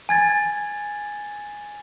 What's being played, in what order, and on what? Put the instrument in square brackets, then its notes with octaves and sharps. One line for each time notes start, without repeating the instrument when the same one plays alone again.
[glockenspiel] G#5 G#6 A6